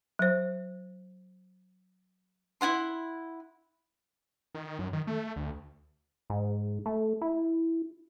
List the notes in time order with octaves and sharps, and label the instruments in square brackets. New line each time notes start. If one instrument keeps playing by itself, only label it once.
[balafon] F#3 C5
[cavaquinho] E4 F4 F#5 C6
[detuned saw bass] D#3
F#2
D#3
A3
D2
[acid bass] G#2
A3
E4